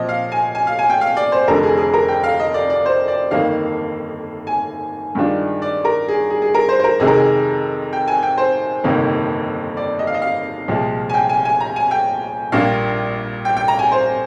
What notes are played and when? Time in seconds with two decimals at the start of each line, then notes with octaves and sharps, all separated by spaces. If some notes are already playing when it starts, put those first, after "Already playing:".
Already playing: A#2 F3 C4 D#5
0.09 F5
0.32 G#5
0.55 G#5
0.67 F5
0.79 G#5
0.90 G5
1.01 F5
1.17 D5
1.32 C5
1.47 F1 F2 D3 F3 A#4
1.63 G#4
1.77 G#4
1.93 A#4
2.08 G5
2.24 F5
2.40 D#5
2.54 D5
2.70 D5
2.86 C5
3.08 D5
3.31 G1 F2 D#3 A#3 F5
4.47 G#5
5.15 G2 D#3 G#3 D4 F4
5.62 D5
5.85 A#4
6.08 G#4
6.30 G#4
6.42 G#4
6.54 A#4
6.69 C5
6.79 C5
6.84 A#4
6.99 F2 C3 D#3 G#3 G#4
7.07 A#4
7.14 G#4
7.93 G5
8.08 G#5
8.23 G5
8.38 C5
8.84 G1 F2 C3 D#3 A#3
9.77 D5
9.99 D#5
10.07 F5
10.14 D#5
10.22 F5
10.68 C2 A#2 F3 G#3
11.10 G#5
11.14 G5
11.29 G#5
11.45 G#5
11.60 A#5
11.76 G#5
11.91 G5
12.52 A#1 A#2 G3 A#3 D4 F5
13.45 G5
13.57 G5
13.68 A#5
13.79 G#5
13.92 C5